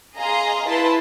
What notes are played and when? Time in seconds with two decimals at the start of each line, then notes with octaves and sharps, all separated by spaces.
0.16 G#4 D#5 F5 A#5 C6
0.67 E4 B4 A5 C6